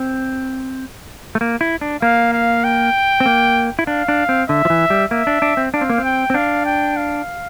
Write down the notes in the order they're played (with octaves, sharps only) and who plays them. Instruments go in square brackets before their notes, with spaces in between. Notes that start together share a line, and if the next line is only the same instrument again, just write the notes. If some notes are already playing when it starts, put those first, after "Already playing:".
Already playing: [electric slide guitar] C4
A3
A#3
E4
D4
[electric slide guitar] A#3 [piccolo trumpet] F5
[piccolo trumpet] F5
G5
[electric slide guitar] C4
A#3
E4
[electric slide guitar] D4 [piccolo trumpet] F5
[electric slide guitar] D4
C4
[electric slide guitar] D3 [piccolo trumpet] E5
[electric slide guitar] F3
E3
G3
[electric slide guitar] A#3 [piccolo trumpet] E5
[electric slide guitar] D4
D4
C4
[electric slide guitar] D4 [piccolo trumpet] F5
[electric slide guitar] C4
A#3
C4
[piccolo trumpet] G5
[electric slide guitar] C4
[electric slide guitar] D4 [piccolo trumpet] F5
[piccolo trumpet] G5
F5